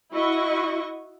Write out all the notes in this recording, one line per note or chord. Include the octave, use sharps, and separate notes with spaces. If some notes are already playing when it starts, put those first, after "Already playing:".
E4 F#4 D#5 C#6